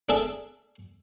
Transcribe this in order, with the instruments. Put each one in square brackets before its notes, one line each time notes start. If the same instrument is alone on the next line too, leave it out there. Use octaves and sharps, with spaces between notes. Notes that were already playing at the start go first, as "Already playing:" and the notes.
[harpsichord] D4 G#4 A4 E5